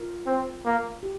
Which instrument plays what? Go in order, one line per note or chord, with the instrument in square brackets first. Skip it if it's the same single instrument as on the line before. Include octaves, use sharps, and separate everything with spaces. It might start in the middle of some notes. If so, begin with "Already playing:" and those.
Already playing: [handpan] F4 A#4
[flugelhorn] C4
A#3
[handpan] G4